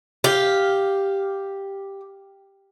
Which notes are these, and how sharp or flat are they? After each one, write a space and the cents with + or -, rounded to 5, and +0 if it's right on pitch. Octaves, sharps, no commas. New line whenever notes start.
G4 +0 F5 +0